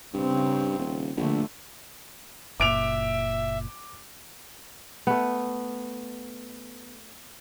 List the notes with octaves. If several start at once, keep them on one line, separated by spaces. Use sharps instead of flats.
G2 C#3 C4
D#1
A#1 D3 A3
F#1 A#2 E5 D6 D7 F7
A3 B3